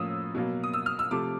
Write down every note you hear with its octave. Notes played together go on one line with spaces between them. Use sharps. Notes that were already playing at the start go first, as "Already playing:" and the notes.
Already playing: A2 F3 A#3 C#4 D#6 E6
B2 F#3 A#3
D#6
E6
F6
E6
C3 F3 A3 D6